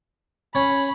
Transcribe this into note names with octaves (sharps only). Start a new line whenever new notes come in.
C#4 B5